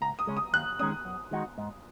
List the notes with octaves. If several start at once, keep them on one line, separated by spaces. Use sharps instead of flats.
C#2 A#5
D#6
C#3 G#3 C#4
D#6
D#2 F#6
D#3 G#3 C#4 D#6
F#2
D#3 G#3 D#4 F#4
G#2